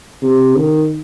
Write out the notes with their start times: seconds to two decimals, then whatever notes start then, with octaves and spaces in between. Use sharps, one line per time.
0.22 C3
0.57 D#3